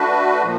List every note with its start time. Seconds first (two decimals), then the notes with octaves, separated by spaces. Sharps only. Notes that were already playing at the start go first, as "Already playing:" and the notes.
Already playing: A3 D4 F#4 B4
0.43 A#2 F3